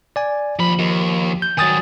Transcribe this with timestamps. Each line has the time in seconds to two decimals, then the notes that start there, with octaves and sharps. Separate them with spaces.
0.16 D5 G#5
0.59 D#2 F3 B5
0.79 D#2
1.42 G6
1.58 D#3 F#3 G#5 D#6 A6